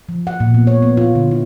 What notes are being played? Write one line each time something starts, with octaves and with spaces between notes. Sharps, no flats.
F3
F#5
A#2
B3
C#5
B3
F4
D3
E4